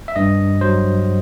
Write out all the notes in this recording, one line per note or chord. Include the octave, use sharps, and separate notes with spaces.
E5
G2 D#5
F#3 C5